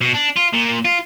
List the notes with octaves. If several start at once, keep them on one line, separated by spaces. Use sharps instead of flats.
B2
D4
F4
A#2
F4